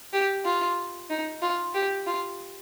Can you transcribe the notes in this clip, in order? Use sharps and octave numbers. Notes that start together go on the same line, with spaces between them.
G4
F4
D#4
F4
G4
F4